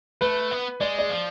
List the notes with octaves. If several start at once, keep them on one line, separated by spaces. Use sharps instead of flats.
A3 B4
B3
G#3 D5
D5
F3